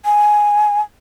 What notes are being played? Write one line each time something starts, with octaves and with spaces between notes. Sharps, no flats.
G#5